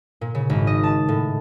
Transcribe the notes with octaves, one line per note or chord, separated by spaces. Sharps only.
A#2
C#3
G#1
D#5
A5
A2